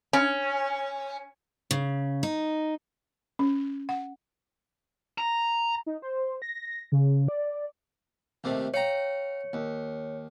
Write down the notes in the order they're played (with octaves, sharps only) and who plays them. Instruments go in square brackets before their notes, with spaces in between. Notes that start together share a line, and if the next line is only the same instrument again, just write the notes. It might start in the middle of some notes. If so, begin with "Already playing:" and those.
[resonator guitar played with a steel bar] C#4
[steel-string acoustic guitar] C#3
D#4
[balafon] C#4
F#5
[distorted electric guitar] A#5
[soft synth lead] D#4
C5
A#6
C#3
D5
[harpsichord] D#2 C3 A3
[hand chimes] C#5 C#7 [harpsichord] F5 G5 A#5
[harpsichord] D#2